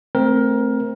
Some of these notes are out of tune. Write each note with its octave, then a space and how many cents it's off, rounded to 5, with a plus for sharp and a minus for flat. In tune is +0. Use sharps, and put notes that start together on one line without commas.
A3 +0 C4 +0 A#4 +20